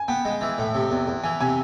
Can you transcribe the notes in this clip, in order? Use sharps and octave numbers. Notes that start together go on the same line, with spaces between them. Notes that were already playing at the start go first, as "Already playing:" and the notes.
Already playing: G#5
B3 G5
G#3
E3
A2
C3
E2
E2
E3 G#5
C3 G#5